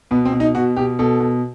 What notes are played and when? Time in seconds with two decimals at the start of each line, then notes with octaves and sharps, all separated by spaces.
0.11 B2 B3
0.25 C4
0.32 B2
0.40 D#4
0.55 B2 F#4
0.77 B2 G4
0.99 B2 A4
1.20 B2